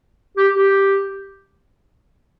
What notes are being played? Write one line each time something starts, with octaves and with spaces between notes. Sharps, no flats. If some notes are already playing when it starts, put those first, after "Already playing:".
G4
G4